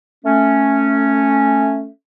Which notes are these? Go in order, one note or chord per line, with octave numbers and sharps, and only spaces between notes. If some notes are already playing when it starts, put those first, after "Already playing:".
A3 C#4